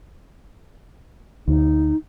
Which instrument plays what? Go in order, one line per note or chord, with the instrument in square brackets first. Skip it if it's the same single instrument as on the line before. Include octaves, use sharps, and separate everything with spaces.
[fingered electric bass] D2 [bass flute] D#4